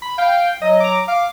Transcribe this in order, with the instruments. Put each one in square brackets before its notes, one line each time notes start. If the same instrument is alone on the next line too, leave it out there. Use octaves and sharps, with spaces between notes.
[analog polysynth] B5
[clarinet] F5 [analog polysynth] G5
[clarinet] F#3 [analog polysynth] D#5
[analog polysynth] A#5 D6
[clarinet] F5 [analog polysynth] D6